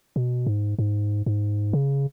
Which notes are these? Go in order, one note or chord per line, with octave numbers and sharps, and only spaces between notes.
B2
G#2
G#2
G#2
C#3